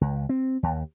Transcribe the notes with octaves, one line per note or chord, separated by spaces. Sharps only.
C#2
C4
D#2